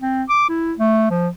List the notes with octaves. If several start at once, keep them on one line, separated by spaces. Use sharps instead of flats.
C4
D6
E4
A3
F3